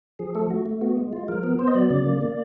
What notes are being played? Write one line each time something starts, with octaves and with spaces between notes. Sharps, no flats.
F3 G#4
A3 A4
A3 F#4
A3
B3 F#4
G#3
G#3 F4
F3 A#4
B3 A#4
B3 C5
D#5
F#3 D5
C#3 D5
A#3
A#3